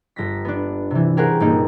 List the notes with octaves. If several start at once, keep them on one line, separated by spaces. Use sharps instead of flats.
G1 A#6 B6
B3 D4
C3 E3
C#4 G4 G#4 A#4 C5 F#5
G1 A#2 A#3 D#4